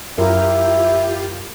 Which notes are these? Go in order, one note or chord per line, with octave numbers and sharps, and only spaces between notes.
F#2 E4 F4 G4 A#4